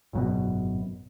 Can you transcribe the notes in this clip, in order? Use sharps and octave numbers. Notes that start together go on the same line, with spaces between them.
G#1 F#2 B2